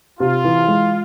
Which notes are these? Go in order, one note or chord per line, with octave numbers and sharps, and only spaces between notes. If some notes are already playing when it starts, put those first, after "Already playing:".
C3 F4
E3
G#3